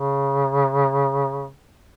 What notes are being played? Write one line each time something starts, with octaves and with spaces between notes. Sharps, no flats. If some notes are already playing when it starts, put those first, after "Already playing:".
Already playing: C#3